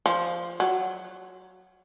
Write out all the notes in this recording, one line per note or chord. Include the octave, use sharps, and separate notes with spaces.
F3
F#3